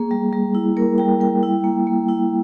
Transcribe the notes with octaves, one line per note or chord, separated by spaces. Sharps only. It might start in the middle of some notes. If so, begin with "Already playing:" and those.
Already playing: A#3 G#4
G3
G3
E4
A#3 A#4
G3 G5
G3 G5
E4
A#3
A#3
E4